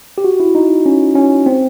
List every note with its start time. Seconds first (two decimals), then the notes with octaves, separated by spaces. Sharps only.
0.18 G4
0.24 F#4
0.40 E4
0.55 D#4
0.86 C#4
1.15 C#4
1.46 C4